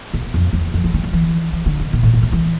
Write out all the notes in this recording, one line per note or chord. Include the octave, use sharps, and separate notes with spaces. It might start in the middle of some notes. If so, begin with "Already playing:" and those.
B2
F2
E2
F2
E3
D3
F3
E3
E3
D3
C3
B2
A2
A2
C3
E3